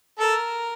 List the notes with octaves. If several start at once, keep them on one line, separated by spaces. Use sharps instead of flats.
A4 A#4